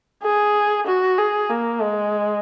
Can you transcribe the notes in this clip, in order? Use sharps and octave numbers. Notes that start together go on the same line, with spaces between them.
G#4
F#4
G#4
A#3
G#3